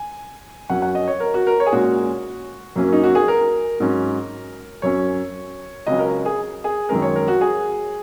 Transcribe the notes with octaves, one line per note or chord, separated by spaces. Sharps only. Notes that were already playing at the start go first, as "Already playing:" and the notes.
Already playing: G#5
F#2 F#3 C#4 F#5
F#5
D#5
C#5
A#4
F#4
A#4
C#5
G#4
A#2 G#3 C#4 F#4
F#2 F#3 A#3 C#4
D#4
F#4
G#4
A#4
G#2 F#3 C#4
F#2 F#3 C#4 C#5
C#2 C#3 F#3 C#4 D#5
A#4
G#4
G#4
F#2 D#3 G#3 C#4 A#4
C#5
A#4
F#4
G#4